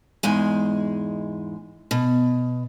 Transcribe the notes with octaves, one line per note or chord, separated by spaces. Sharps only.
E2 G#2 G#3 G#5
B2